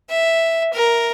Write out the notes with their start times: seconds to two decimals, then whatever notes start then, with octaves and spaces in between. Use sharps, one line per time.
0.10 E5
0.73 A#4